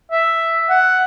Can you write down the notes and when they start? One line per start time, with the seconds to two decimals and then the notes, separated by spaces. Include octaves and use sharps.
0.11 E5
0.70 F#5